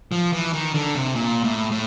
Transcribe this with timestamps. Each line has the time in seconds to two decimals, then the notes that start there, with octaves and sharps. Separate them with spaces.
0.12 F3
0.33 E3
0.53 D#3
0.74 D3
0.95 C3
1.15 A#2
1.44 A2
1.71 A2